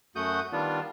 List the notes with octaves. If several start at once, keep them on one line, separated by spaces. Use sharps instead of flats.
F#2 A3 F#4 F#5 D#6 G6
D#3 G3 B3 D4 F4